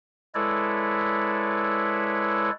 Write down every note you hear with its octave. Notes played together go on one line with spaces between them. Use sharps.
G#3 E4 A4 B4 C#5 D5